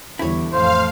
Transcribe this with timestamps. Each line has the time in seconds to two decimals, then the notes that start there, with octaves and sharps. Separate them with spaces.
0.19 E2 D3 G3 E4 C#5
0.52 A1 F2 A3 C5 F5